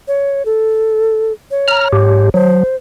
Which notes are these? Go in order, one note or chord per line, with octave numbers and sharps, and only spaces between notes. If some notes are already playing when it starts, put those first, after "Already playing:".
C#5
A4
C#5
A#5 F6
G#2 G4
F#3 C5